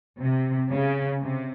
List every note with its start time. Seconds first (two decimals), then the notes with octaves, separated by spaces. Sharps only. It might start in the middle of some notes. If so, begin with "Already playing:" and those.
0.20 C3
0.70 C#3
1.22 C3